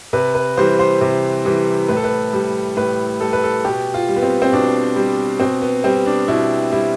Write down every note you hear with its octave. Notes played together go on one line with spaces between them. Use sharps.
C3 B4
B4
E3 G3 C5
C5
C3
E3 G3
A2 B4
A4
B4
G3
A2 B4
G3 A4
B4
A4
B2 G4
F4
G3
B3
C4
C4
B2 D4
G3
B2 C4
B3
G3 C4
D4
B2 E4
G3 E4